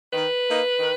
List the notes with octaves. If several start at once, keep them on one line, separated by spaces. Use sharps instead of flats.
D#3 B4
A#3 D#4
D#3